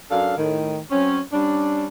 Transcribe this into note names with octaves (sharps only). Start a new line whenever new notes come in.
F#2 D4 A4 F5
A2 D#3
F#3 C4 C#4
G3 C#4 D4